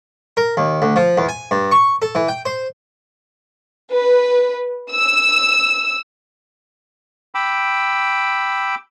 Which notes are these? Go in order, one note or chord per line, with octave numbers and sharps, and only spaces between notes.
A#4
D#2
D2
F3
E2
G#5
G2
C#6
A4
E3
G5
C5
B4
E6
G5 B5 D6 E6